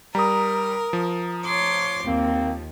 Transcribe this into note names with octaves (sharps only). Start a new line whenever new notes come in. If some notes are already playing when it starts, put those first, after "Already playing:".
G3 A#4 A#5 D#6
F3
C#5 C6 D6
D#2 A#3 C4